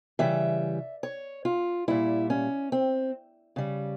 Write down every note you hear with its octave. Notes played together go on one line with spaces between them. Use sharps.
C#3 E3 G3 E5
C#5
F4
A#2 G3 E4
C#4
C4
C#3 G3